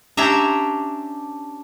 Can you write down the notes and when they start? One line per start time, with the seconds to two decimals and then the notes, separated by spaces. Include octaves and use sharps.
0.17 C#4 D4 G4 E5 A#5